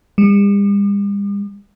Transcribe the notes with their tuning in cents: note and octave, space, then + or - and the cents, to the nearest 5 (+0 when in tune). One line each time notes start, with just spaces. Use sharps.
G3 +45